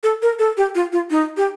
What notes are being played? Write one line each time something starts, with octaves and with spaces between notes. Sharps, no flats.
A4
A#4
A4
G4
F4
F4
D#4
G4